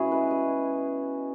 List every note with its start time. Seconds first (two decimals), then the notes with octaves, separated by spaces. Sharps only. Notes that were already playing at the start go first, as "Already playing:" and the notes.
Already playing: B2 G#3 C#4 E4 F#4 G#4
0.12 B4
0.31 G#4